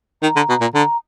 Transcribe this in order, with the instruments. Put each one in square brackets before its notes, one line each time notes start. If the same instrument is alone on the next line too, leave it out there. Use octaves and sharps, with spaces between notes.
[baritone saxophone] D#3 [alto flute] A#5
[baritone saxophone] D3
B2
A#2
[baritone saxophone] D3 [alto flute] A#5